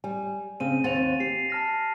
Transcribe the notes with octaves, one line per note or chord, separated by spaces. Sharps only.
G3 G#5
C#3 C4 D#7
D#2 C4 F#5 A6 D#7 F7
G4 C7
A5 F6 A#6